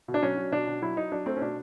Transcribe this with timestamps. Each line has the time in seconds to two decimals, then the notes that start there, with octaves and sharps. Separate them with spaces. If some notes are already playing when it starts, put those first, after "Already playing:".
0.08 B2
0.14 D4
0.22 F#3 C#4
0.37 F#3
0.52 B2 D4
0.67 B2
0.82 F#3 E4
0.96 F#3 D#4
1.12 F#3 D4
1.26 A3 C4
1.37 C#4
1.42 B2 D4